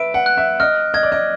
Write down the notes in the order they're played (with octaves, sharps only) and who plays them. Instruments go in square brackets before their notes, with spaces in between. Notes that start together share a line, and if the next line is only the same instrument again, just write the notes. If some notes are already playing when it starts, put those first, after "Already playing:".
Already playing: [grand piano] B4 E5 [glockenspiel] D7
[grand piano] F#5
[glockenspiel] F#6
[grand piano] E5
[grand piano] D#5 [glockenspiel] F6
[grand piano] D#5 [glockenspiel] G#6
[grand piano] D5
D#5